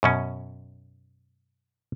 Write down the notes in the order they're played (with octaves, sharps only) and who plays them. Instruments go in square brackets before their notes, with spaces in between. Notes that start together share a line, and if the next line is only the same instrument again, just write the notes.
[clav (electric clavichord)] F#2 B2 C#4